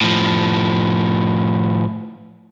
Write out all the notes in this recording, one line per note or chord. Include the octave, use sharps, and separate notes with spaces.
A2 F3